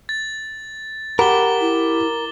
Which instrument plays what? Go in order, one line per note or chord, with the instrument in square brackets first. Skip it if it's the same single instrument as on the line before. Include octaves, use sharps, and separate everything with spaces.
[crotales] A6
[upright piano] G4 F#5 B5 [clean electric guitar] A#4 [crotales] D6 G7
[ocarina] E4